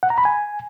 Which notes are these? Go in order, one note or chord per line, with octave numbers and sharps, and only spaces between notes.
F#5
A#5
B5
G#5